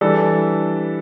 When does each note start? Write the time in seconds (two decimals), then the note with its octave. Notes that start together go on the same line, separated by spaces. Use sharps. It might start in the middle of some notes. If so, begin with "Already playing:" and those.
0.01 E3 G3 D4 A4